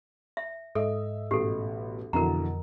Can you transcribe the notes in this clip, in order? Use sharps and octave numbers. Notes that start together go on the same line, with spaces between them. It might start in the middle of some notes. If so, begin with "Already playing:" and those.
E5
G#2 A4 D#5 E5
A1 B2 G4 A4
F2 B2 D3 E3 A#4 A#5